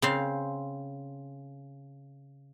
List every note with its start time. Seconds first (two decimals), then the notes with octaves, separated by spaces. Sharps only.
0.02 C#3 C4 F5